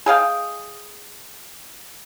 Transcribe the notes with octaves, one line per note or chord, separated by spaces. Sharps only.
G#4 D#5 F5 G5